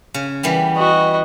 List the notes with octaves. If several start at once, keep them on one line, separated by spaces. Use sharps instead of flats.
C#3
E3 G3 B3
F#4 D#5